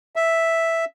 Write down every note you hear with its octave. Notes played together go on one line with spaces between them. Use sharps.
E5